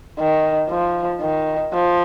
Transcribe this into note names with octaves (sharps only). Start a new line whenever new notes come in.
D#3
F3
D#3
F3